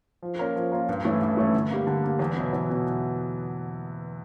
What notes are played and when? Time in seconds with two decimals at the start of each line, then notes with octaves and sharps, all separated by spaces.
0.22 F3
0.39 A#3 C#4 F4 A#4
0.56 F3
0.72 A#3 C#4 F4 A#4
0.89 G2
1.05 E3 A3 C#4 E4
1.21 G2
1.37 E3 A3 C#4 E4
1.53 D3
1.70 G3 A#3
1.87 D3
2.03 G3 A#3
2.19 E2
2.36 B2 F#3 B3 E4
2.53 E2
2.69 B2 F#3 B3 E4